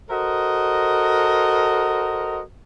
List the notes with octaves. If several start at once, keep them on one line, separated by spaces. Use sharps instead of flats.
F#4 A4 A#4 C5 D#5